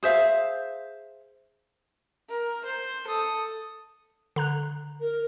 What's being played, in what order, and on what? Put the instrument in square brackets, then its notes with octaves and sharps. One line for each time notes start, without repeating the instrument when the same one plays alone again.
[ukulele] G#4 C5 E5 F5
[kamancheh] A#4
C5
A4 D#6
[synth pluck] D3 A#5 F#6
[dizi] A#4